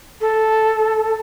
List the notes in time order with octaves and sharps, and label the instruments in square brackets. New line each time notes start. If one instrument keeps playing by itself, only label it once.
[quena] A4